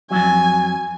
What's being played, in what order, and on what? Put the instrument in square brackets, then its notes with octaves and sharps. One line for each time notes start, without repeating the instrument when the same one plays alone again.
[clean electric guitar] F2 G#2 F#3 [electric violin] G#5